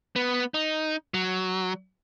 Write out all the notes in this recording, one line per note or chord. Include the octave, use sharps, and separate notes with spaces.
B3
D#4
F#3